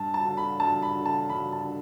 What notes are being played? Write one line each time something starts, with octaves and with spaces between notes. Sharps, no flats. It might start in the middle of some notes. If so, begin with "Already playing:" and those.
Already playing: G2 A5
A5
D3
B5
G2 A5
B5
D3
A5
G2 B5
A5
D3